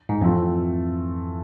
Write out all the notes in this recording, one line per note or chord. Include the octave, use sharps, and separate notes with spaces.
G#2
F2 E3 A3 C4 F4